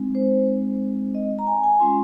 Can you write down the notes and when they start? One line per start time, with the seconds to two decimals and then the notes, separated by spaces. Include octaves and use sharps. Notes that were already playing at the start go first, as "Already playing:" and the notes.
Already playing: G#3 C4 D#4
0.15 C5
1.15 D#5
1.39 A#5
1.47 G#5
1.64 G#5
1.80 G#3 C#4 F4 C6